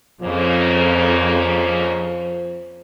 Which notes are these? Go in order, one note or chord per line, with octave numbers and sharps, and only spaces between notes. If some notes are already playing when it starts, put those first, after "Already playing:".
F2 G#2 C#3 F3 A#3